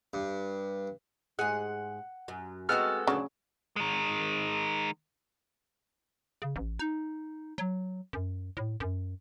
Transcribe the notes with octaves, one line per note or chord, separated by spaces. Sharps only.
G2
G#2 G#4 F#5
F#2
G#3 B3 C4 F#4 A4 F6
D2 C#3 F#3 D4
D#3 G#3
C#3
A1
D#4
F#3
F#2
A2
F#2